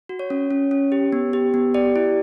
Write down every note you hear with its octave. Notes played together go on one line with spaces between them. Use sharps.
F#4
C#5
C#4
C#4
C#4
G4
B3
G4
B3
G4 D5
E4